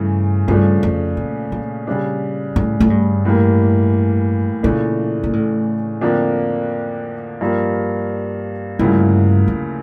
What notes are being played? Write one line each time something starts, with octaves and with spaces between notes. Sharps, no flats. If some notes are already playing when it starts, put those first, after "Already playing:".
Already playing: G2 C#3 E3 A3
G2 C#3 F3 A3 D4
F2
A#2
A#2
C#3 G3 D4
A2
A2
G2
A2 E3 G3 A#3
A#2 C#3 E3 A3 D4
A#2
A2
F2 D3 F3 A#3 D4
G2 F3 A#3
D2 G2 C#3 F3 A#3 E4
F2